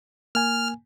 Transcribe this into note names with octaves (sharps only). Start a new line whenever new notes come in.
A#3 G#5 F6